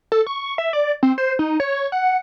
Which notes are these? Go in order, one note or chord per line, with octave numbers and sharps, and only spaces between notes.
A4
C#6
E5
D5
C4
C5
D#4
C#5
F#5